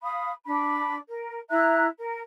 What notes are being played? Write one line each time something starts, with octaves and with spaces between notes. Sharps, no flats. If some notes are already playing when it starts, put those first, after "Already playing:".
F5 B5 D#6
D4 B5
A#4
E4 E5 A#5 F#6
A#4